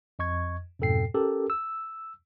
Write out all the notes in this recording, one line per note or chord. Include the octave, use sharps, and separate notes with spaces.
F2 D#5 C#6 G#6
F2 G#2 B2 A4 G5 C7
C#4 G4 A4 A#4
E6